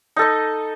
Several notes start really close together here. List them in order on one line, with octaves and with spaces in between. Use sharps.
D#4 A4 D#5